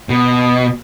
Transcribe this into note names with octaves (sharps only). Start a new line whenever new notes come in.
B2